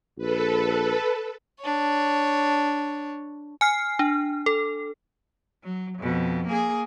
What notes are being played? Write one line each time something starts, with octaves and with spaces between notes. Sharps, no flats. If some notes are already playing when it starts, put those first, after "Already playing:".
A#1 A4 B4
D4 C#5
G#5 F6 C7
D4
A4
F#3
F2 B2
A#3 G#4